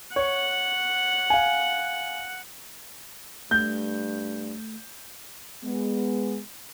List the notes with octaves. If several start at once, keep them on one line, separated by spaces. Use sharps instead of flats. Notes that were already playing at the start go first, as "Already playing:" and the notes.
C#5 F#5
F5 G#5
G2 A3 G6
G#3 B3